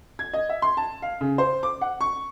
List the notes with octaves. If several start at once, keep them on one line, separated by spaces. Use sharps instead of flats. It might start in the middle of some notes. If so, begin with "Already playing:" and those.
G#6
D#5
E5
C6
A5
F5
C#3
C5
D6
F#5
C#6